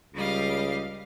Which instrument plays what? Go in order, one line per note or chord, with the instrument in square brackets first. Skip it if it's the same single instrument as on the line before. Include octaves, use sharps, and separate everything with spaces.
[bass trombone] C#2 [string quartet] G3 D#5 F5